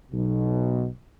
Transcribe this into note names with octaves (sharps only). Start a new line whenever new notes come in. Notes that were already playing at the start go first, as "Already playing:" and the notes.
B1 B2